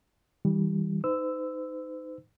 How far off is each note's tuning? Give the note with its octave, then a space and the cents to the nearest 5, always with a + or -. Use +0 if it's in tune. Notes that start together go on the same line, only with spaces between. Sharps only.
E3 -45 G3 +0
D#4 +0 C5 -45 E6 +0